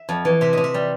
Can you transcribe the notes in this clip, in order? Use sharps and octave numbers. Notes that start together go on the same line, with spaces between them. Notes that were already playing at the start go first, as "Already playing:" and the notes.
Already playing: E5
F2
E3
C3 E5
C3 D#5
E5
G3